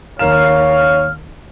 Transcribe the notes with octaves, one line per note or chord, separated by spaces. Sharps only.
D#2 A#4 C#5 F5 F6 E7